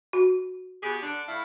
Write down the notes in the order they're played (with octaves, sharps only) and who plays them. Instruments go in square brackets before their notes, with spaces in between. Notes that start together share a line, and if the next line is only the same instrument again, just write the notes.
[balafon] F#4
[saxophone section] B2 G4 G#4
D3 D4
A2 E4 F5